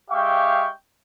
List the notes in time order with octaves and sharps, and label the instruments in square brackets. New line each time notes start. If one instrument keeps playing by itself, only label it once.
[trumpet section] G#3 G4 E5 F5 G5 C#6